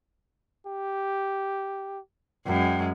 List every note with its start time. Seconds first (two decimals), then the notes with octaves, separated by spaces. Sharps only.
0.66 G4
2.46 F#2 G#3 G5